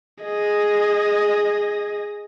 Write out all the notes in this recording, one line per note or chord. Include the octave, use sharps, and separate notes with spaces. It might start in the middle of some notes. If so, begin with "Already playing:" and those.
G#4 D#5